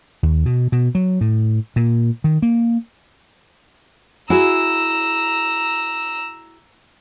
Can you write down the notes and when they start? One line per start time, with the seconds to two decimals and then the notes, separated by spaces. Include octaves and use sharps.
0.23 D#2
0.46 B2
0.72 B2
0.95 F#3
1.21 A2
1.76 A#2
2.24 D#3
2.42 A#3
4.30 E4 F#4 G#4 A#5 E6